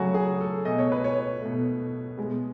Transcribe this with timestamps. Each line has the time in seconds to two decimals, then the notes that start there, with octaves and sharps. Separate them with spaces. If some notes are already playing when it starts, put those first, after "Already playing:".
Already playing: C#3 F#3 A3 F#4 G#4
0.14 G#4
0.40 A4
0.65 B2 A3 D#5
0.79 C#5
0.92 B4
1.04 C#5
1.42 B2 A3
2.17 B2 G#3 B3